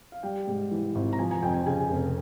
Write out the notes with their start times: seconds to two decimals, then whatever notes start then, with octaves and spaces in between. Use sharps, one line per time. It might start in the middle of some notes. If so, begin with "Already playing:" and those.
0.12 F5
0.23 G3 G5
0.47 G#2
0.71 E3
0.95 G#1
1.13 A#5
1.19 F3 G#5
1.31 G#5
1.42 F2 G5
1.54 G#5
1.66 C#3 G#5
1.90 F1